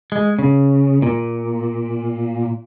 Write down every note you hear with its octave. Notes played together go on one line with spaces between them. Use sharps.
G#3
C#3
A#2